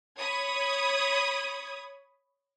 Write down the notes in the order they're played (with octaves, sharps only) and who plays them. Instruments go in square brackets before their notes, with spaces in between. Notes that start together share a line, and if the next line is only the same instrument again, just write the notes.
[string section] C#5 B5 D#6 G#6